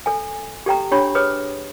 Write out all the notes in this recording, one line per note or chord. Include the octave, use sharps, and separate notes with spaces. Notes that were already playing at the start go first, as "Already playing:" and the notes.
A4 G#5
G4 A4 G5 A#5
D4 G4 C#5 B5 C#6
G#4 B4 C#5 D#6